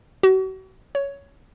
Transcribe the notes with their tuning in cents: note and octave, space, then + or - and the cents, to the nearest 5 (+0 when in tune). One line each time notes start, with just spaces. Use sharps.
F#4 +40
C#5 +10